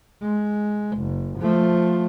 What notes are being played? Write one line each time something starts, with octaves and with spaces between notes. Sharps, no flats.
G#3
F#1
F3 A3